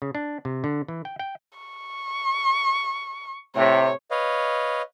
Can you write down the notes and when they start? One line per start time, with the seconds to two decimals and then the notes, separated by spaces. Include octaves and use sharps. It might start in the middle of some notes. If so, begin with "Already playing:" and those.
0.02 C#3
0.15 D4
0.45 C3
0.64 D3
0.88 E3
1.05 G5
1.19 G5
1.59 C#6
3.56 A2 C3 C#5
4.11 B4 C#5 D#5 F5